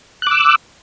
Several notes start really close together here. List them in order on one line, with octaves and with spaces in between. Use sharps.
F#6 D6 E6